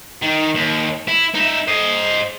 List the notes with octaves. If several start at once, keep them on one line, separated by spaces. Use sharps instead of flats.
D#3
D#2
E4
D#4 E5
C5 D#5